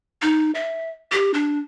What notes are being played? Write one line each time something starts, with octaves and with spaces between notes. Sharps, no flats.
D#4
E5
G4
D4